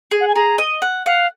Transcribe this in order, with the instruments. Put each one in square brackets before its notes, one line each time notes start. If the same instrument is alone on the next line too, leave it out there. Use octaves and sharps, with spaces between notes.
[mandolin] G#4
[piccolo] F#5
G#5
[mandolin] G#4 [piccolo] A#5
[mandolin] D#5
F#5
[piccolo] F5 [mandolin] F#5